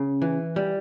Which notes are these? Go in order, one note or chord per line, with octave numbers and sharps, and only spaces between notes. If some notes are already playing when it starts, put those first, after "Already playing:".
Already playing: C#3
E3
G3